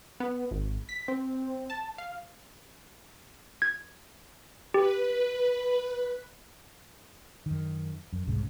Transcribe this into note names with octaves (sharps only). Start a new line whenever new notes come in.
B3
G#1
B6
C4
A5
F5
G#6
G4 B4
F#2 D#3
F#2
E1 C2 G#2 C#3